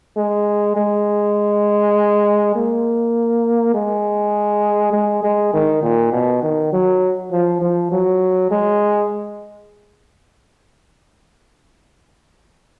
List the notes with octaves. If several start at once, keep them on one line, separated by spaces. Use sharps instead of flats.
G#3
G#3
A#3
G#3
G#3
G#3
D#3
A#2
B2
D#3
F#3
F3
F3
F#3
G#3